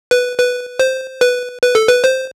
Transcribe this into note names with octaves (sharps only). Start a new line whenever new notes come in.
B4
B4
C5
B4
B4
A4
B4
C5